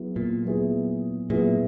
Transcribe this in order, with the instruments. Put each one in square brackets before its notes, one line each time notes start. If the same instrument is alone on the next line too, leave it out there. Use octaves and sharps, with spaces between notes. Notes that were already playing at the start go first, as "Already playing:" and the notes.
Already playing: [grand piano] F#3 B3 E4 G#4
[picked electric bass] A#2
[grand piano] F#3 B3 E4 G#4
[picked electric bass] A#2 [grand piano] F#3 B3 E4 G#4